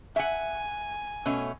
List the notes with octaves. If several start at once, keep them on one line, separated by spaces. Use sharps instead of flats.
E5 F#5 G#5
B2 A3 C#4